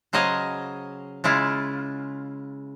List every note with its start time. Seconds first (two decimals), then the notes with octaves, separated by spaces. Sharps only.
0.13 C#3 F#3 C5 D#5 F5 G#5
1.24 C#3 G#3 E4 F4